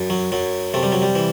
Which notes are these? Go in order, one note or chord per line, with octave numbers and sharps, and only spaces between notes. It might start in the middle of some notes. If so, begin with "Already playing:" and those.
Already playing: F#2
F#3
F#2 F#3
C3 A3
G3
F#3
G3
E3